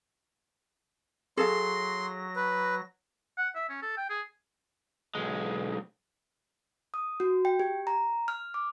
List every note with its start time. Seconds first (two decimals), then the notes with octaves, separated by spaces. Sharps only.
1.37 F#3 G#4 A4 F5 C6 A#6
2.36 B4
3.38 F#5
3.55 E5
3.69 C#4
3.82 A4
3.97 G5
4.10 G#4
5.15 B1 G#3
6.94 D#6
7.20 F#4
7.45 G5
7.60 G4
7.87 A#5
8.28 F6
8.54 D6